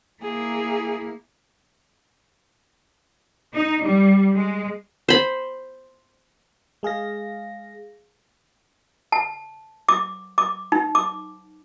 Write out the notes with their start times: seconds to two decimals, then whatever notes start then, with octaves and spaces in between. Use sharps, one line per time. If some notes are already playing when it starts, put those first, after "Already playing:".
0.22 A#3 E4 G#4
3.54 D#4
3.83 G3
4.35 G#3
5.09 C5 B5
6.83 G#3 G#4 F5 A#6
9.12 A5
9.89 D6
10.38 D6
10.72 D#4
10.95 D6